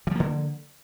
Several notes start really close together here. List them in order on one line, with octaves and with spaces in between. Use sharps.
E3 F3 A#3 D3